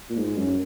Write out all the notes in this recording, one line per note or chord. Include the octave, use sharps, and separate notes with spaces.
A#2
G#2
F#2